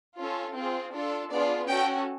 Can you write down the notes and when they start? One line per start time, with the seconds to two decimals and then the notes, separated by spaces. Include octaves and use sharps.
0.18 C#4 F4 A4
0.56 C4 F4 G#4
0.93 D4 F4 A4
1.31 B3 D4 F4 G#4 D5
1.68 C#4 F#4 A4 G5